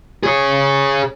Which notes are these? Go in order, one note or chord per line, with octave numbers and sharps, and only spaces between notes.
G#4 C#5